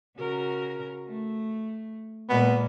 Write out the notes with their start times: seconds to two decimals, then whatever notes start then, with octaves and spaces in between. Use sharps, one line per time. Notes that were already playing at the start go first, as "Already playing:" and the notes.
0.17 C#3 F#4 A#4
1.08 A3
2.30 A#2 G#3 A#3 B3